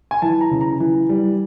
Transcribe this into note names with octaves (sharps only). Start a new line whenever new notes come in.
G#5
E3 A5
A#5
C#3
A#5
E3
G3